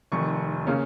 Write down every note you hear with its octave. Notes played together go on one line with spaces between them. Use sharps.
F1 F2 D#3 C#6
C#3 A#3 C#4